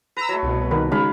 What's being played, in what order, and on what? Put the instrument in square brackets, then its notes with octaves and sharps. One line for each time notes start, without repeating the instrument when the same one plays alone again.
[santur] B4 [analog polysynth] A#5 E6
[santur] F#3 A3
[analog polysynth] C2 B2
[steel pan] D#3 A#4 B4
[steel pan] C#3 G#3 D#4 [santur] F#3 F5 B5